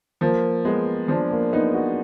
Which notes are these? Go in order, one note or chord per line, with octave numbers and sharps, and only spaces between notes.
F3 A#3
G#3 B3
F3 D4
A#3
B3 D#4
F#4